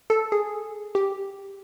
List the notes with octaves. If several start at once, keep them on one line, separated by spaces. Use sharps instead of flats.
A4
G#4
G4